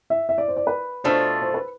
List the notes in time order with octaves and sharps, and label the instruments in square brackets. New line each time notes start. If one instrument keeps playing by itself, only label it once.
[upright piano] E5
E5
D5
C5
D5
B4
[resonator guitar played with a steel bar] B2 A3 D4 F4 A4 [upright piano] C5
[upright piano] C5
B4